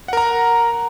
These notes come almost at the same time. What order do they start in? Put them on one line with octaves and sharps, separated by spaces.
F#5 A#4 A#5